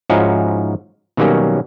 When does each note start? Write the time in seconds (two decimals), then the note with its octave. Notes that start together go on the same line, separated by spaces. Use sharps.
0.10 G#2 F3 C#4 D#4 E4 F#4
1.17 B2 D#3 F#3 G3 A#3 C#4